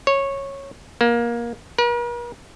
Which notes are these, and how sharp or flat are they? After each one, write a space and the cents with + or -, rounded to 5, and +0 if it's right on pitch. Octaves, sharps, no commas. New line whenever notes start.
C#5 -10
A#3 +20
A#4 +45